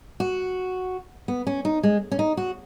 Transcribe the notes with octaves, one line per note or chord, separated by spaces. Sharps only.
F#4
B3
C#4
D#4
G#3
C#4
D#4
F#4